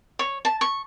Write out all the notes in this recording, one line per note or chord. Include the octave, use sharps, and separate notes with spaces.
C#5
A5
C#6